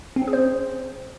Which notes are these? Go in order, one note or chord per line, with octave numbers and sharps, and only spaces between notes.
C4
C#4
G#4
C5